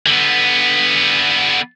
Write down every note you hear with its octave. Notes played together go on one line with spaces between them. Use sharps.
D3 B3